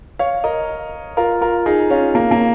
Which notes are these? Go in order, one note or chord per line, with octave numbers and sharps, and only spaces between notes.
C#5 F5
A#4 D#5
F4 A#4
F4 A#4
D#4 G#4
C#4 F4
A#3
A#3